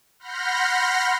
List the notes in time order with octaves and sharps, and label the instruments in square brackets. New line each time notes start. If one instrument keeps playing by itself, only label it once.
[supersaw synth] F#5 B5 C6 F6 G6 A#6